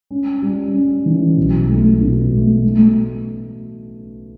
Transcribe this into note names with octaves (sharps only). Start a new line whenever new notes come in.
C#4
G3
C#4
E3
B1
A3
B2
A3
A3